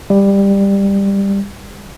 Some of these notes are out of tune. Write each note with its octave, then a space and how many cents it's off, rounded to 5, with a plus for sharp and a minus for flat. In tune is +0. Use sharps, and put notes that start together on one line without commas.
G3 +15